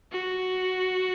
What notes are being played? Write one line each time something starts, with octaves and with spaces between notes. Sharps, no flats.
F#4